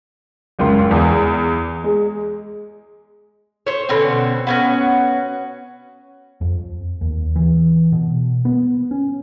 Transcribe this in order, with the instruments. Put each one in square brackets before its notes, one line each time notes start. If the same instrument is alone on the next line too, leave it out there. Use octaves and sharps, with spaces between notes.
[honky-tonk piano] F#1 C#2 C6
E2
G#3
[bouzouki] C5 C#5
B2 D3 C4 C#4
B3 C#4 F#4
[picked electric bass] F2
D#2
E3
B2
B3
C#4